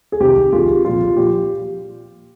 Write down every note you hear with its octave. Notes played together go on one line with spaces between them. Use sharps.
G#4
C2 C3 D#3 G4
C2 C3 D#3 F4 G#4
C2 A#2 F3 F4
A#2 F3 G4